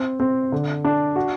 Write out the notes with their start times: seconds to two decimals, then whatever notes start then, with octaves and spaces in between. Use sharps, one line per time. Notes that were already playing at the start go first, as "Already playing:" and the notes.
Already playing: C4
0.20 C4
0.52 D3
0.84 D4
1.16 F#4